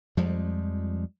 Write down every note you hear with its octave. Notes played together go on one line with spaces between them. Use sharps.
F2 F3 G3 G#3